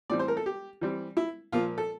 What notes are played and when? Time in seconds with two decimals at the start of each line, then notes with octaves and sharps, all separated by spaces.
0.10 A2 E3 G3 C4 D5
0.19 C5
0.28 A#4
0.37 A4
0.46 G4
0.81 E3 G3 C4
1.17 E4
1.52 A#2 F3 A#3 F4
1.78 A4